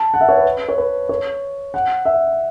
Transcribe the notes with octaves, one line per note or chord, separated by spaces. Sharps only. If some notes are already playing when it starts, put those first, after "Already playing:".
Already playing: A5
F#5
E5
C#5
B4
C#5
B4
C#5
F#5
E5